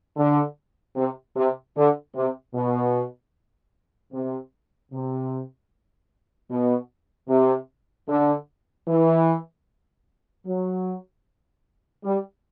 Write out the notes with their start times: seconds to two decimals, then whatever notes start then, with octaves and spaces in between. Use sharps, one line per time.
0.17 D3
0.96 C3
1.36 C3
1.76 D3
2.15 C3
2.55 B2
4.13 C3
4.92 C3
6.51 B2
7.29 C3
8.08 D3
8.88 E3
10.46 F#3
12.05 G3